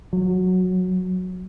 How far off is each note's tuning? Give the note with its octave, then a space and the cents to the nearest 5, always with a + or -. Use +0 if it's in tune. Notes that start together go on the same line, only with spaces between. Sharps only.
F#3 -10